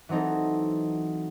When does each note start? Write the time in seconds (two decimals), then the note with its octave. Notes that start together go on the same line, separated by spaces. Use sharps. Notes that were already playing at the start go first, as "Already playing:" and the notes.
0.09 E3 F#3 C4 D#4 A4